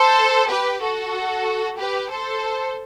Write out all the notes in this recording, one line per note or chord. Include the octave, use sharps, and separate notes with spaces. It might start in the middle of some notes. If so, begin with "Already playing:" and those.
Already playing: A4 C5
G4 B4
F#4 A4
G4 B4
A4 C5